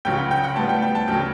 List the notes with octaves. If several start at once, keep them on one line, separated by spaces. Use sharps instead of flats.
C#2 C#3 F#3 G5
F#5
G5
F#5
A2 G3 B3 A5
G5
G5
A5
D2 C#3 F#3 G5